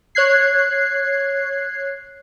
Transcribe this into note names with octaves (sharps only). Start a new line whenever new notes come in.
C#5 F#6 G#6 C7